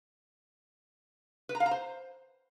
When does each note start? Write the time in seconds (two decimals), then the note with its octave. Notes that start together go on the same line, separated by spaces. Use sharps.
1.49 B4
1.55 A#5
1.60 F5
1.66 A#5
1.71 C5